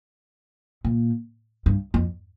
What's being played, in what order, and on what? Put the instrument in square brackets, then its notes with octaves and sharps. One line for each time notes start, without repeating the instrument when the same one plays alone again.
[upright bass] A#2
G2
F2